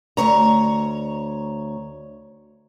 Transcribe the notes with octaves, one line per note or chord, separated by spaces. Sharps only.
D2 G2 C#5 A#5